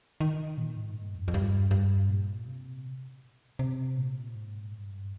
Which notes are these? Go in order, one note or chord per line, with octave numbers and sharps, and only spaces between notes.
D#3
A#2
G#2
G2
F2
F2
G2
G2
A#2
C3
C3
A#2
G#2
G2